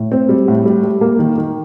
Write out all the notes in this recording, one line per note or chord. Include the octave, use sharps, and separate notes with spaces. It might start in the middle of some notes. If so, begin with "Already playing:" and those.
Already playing: A2
C4
G3
A2
G3
G3
A#3
D#3
D#3